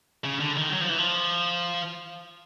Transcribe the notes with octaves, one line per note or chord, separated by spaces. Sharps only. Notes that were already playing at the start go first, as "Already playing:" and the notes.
C#3
D3
D#3
F#3
F3
E3
F3